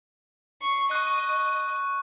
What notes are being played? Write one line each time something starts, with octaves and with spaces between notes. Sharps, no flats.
C#6 C7
D#5 C#6 F#6